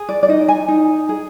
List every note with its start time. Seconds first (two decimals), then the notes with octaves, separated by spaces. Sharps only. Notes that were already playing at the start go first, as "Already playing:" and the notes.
Already playing: G#4
0.09 D5
0.23 D5
0.28 D#4 D#5
0.48 G#5
0.68 D#4
1.09 G#4